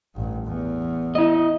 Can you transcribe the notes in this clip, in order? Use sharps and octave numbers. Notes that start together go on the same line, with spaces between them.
A1 G2
E2
E4 D#5